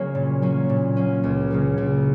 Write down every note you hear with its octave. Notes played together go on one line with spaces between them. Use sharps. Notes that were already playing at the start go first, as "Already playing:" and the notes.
Already playing: C#3 F#3 A#3 C#4
A#2
F#3 A#3 C#4
A#2
F#3 A#3 C#4
C#2
C#3 F#3 A#3
C#2